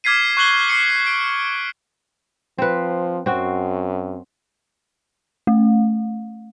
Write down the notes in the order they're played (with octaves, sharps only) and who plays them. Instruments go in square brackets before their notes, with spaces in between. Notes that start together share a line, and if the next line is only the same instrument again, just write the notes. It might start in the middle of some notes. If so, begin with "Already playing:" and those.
[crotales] D6 F6 G#6 B6 C7 D#7
C#6 F#6 C7 F#7 G7
D6 C7 C#7 D#7
D7
[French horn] F3 [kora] C4 B4
[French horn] F#2 [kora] C4 F#4
[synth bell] A3